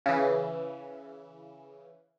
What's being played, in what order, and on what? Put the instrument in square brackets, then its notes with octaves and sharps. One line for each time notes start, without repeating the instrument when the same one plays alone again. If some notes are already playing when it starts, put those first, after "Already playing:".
[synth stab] C#3 E3